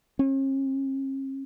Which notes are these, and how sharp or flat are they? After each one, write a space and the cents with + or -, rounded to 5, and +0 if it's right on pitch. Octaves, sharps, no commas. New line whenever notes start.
C#4 -45